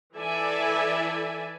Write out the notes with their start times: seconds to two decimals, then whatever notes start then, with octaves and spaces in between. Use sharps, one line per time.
0.14 E3 E4 A4 D5 E5 G#5